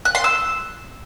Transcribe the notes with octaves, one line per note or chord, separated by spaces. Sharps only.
F#6
C6
E6